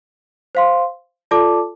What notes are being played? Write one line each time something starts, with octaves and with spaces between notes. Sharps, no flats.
C5 F5 C6
F4 A4 D5 A5 D6